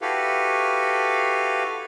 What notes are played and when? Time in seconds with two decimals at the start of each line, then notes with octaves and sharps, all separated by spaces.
0.02 E4 F#4 G4 A4 B4 F5